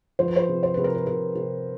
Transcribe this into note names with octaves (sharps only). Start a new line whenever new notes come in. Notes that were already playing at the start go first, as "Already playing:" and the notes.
F3 C5
B4
C5
C3
C5
C3 B4
A#4
B4
C3 A#4
C3